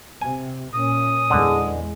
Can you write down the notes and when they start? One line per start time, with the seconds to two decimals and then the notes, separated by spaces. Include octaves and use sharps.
0.21 C3 G#5
0.74 A#2 C#4 D#6
1.30 E2 D3 G#3